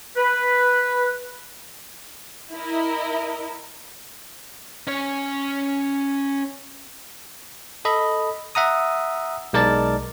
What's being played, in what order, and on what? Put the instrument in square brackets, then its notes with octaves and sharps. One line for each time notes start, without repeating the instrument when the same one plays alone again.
[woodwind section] B4
[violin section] E4 A#4 D#5
[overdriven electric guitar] C#4 C#5
[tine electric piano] A4 D#5 B5
E5 F#5 A#5 D#6
B1 G#3 A#4 D5 A5 A6